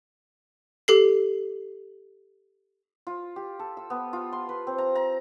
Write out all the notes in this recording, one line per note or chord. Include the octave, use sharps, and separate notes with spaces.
G4 A4 C7
F4
G4
A4
E6
B3
F4
C6
B4
C4
A#5
A#5